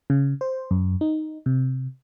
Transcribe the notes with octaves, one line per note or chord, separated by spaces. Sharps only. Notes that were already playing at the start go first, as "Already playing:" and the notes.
C#3
C5
F#2
D#4
C3